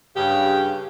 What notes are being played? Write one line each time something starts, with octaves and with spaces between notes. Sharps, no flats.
G2 C#3 G4